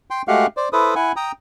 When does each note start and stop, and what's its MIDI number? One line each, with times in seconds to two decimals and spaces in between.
0.10 0.22 79
0.10 0.22 84
0.28 0.46 56
0.28 0.46 57
0.28 0.46 66
0.28 0.46 67
0.28 0.46 77
0.28 0.46 78
0.57 0.69 72
0.57 0.69 74
0.73 0.94 64
0.73 0.94 69
0.73 0.94 71
0.73 0.94 72
0.73 0.94 87
0.95 1.12 64
0.95 1.12 78
0.95 1.12 80
1.16 1.32 79
1.16 1.32 82
1.16 1.32 87